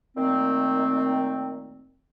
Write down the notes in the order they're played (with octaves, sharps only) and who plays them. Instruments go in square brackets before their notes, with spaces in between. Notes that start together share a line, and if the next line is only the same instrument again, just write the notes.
[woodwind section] A#2 D#3 A3 C4